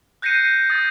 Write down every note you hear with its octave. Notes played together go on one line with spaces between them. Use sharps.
F#6 G6 A#6 C7 C#7 D#7
D#6 A6